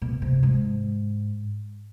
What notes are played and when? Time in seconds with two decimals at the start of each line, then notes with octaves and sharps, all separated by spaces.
0.02 B2
0.22 C3
0.43 G#2